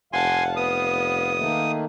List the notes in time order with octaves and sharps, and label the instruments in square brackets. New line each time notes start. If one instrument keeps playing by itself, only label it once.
[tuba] F1 [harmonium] F5 [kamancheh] F#5 A5 [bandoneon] G#5 C6
[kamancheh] B3 [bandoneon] D#6
[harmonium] D#3 A3 A#3